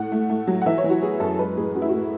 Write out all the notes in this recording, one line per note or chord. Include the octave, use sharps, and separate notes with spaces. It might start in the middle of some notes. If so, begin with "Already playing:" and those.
Already playing: A2 F#5
A3
A3
F#3
F#5
E3 E5
C#5
E3 E4
F#4
B3 G#4
F#2 A4
G#3 B4
A2 G#4
C#4 F#4
E4
A2 F#4